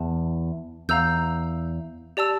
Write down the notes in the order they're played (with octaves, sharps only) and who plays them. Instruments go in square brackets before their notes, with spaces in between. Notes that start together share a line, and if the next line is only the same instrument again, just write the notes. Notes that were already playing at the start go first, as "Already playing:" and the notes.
Already playing: [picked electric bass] E2 [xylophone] A5
[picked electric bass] E2 [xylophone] F5 A#5 E6 G6
[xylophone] G4 D5 A5 E6